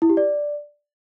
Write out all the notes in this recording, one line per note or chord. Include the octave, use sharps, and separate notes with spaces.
E4
G4
D5